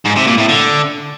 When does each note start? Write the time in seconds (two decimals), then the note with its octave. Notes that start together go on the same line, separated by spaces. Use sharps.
0.05 G#2
0.16 C3
0.27 A#2
0.38 A2
0.49 D3